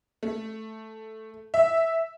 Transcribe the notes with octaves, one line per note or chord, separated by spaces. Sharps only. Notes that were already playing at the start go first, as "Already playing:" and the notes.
A3
E5